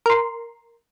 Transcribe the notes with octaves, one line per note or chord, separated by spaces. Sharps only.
A#4 C6